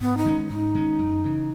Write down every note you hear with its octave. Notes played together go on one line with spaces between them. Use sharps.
G#2 B3
D#4
D#3 G#3 C#4
G#2 D#4
D#3 G#3 C#4
F#2
C#3 E3